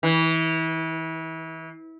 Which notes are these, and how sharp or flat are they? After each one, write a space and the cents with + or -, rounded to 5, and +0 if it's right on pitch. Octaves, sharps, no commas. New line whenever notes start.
E3 -30